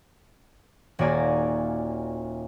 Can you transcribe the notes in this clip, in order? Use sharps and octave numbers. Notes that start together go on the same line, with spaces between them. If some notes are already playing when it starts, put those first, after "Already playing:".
D#1 A#3 F#4 D5 G#5 A#5